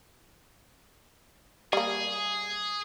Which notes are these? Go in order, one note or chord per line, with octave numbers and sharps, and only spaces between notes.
G3 A#3 G#4